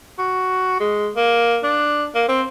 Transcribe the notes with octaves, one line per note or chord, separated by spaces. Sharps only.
F#4
G#3
A#3
D4
A#3
C4